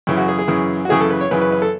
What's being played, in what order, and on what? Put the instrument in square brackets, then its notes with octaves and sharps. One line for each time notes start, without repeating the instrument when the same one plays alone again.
[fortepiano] F#2 C#3 E3 E4
F#4
G#4
G#4
F#2 C#3 E3
F#4
F#2 C#3 E3 G#4
A4
B4
C#5
F#2 C#3 E3 B4
B4
B4
A4